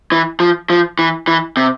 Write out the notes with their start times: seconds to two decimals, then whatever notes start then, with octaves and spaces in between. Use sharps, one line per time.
0.12 E3
0.40 F3
0.70 F3
0.99 E3
1.28 E3
1.57 C3